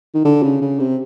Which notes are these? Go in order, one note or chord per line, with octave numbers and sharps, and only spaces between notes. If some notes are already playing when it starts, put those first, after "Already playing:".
D#3
D3
C#3
C#3
C3